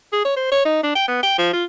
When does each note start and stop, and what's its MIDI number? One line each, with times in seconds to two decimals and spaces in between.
0.13 0.24 68
0.25 0.35 73
0.36 0.48 72
0.52 0.62 73
0.65 0.83 63
0.84 0.91 62
0.95 1.06 79
1.08 1.18 59
1.23 1.34 79
1.38 1.50 53
1.53 1.65 65